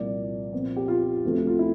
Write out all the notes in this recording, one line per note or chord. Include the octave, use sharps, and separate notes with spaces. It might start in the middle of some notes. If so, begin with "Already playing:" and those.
Already playing: C2 A#2 F3 A#3 D5
A#2 F3 C4
G4
F4
D2 D3 F3 A3 C4
F4
E4